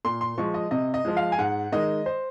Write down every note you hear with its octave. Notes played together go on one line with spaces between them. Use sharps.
A#2 C6
C6
F3 G#3 C#6
D#5
C3 D#5
D#5
F3 G#3
F5
G#5
G#2 F#5
D#3 G#3 D#5
C5